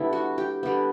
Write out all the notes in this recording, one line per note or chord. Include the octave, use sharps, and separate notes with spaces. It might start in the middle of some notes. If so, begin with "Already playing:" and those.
Already playing: D3 G3 B3 E4
F#4
G4
D3 G3 B3